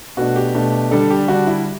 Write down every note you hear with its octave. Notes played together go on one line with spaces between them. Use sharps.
B2 A3 D4 F#4
G4
B2 A3 D4
D3 G3 D4 A4
G4
D3 G3 D4 F#4
E4